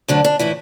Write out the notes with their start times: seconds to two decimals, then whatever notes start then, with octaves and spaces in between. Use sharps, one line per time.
0.08 D2 D3 F#3 D4
0.24 D4
0.39 A2 E3 E4